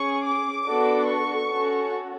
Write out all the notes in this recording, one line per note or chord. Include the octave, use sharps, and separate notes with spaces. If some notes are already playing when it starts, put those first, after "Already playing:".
Already playing: C#4 G#4 C#6
D6
B3 D4 F#4 A4
C#6
C#4 F#4 A4